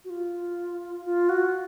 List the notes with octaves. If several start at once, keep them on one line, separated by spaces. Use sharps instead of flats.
F#4
F4
F4
F#4